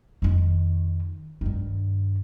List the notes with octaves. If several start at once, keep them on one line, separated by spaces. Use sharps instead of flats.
F2 D#3
G2 D#3